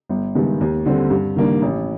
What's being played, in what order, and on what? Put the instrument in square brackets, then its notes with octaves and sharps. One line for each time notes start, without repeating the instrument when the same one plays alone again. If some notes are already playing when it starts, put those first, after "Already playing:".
[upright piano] G1
G2 D#3 G#3 B3
D#2
D3 G3 C4
G2
D#3 G3 A#3 D4
A1